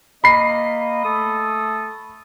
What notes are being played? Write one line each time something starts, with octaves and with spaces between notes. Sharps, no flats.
A#3 D#5 B5 C7
A3 A4 D#6